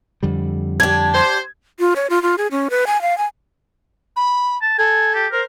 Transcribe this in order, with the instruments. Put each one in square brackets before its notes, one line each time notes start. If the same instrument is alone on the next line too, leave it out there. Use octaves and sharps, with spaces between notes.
[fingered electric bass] F2 D3 G3
[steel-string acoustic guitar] D4 G4 [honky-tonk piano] G#6
[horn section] C5
[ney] F4
C#5
F4
F4
G#4
C#4
B4
G#5
F5
G#5
[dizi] B5
[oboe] A5
[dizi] A4 [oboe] G#5
[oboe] G4
[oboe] A#4 [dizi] C5